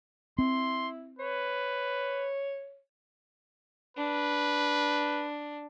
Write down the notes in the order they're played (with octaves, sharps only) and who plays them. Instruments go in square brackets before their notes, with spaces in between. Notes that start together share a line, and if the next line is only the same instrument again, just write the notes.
[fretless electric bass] C4 [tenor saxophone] E4 [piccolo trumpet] C6
[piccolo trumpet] B4 [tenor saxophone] C#5
[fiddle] D4 [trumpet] B4